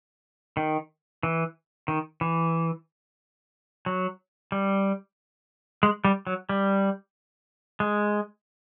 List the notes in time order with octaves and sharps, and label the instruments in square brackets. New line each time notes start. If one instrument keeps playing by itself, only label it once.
[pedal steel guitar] D#3
E3
D#3
E3
F#3
G3
G#3
G3
F#3
G3
G#3